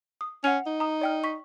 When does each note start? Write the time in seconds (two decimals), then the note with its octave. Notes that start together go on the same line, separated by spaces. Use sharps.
0.21 D#6
0.44 C#4 F#5 C#7 F7
0.66 D#4
0.80 A#5 D#6
1.01 D5 G5 F6
1.24 C#6 B6